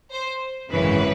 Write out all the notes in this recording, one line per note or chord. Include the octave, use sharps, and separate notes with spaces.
C5
G#1 F#2 C#3 E3 B4